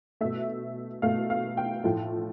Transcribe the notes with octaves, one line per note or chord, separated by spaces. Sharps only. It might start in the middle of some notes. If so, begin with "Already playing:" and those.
B2 A3 E5
B2 A3 F5
F5
G5
A2 F3 A3